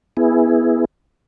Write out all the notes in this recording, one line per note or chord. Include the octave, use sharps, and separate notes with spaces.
B3 E4 G#4